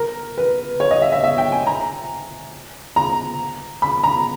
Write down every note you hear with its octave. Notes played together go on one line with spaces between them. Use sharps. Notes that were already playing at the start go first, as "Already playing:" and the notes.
Already playing: A#4
B4
C#5
D#5
E5
E5
E5
G5
G#5
A#5
A#5
B5
A#5